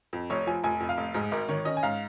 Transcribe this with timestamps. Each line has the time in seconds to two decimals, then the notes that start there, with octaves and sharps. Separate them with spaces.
0.13 F2
0.30 F1 C#5
0.47 F3 G#5
0.63 F1 G#5
0.80 F2
0.89 F5
0.97 F1
1.14 G#2 G#4
1.31 G#1 A#4
1.49 D#3 C#5
1.65 C#4 D#5
1.77 G#5
1.83 G#2 F5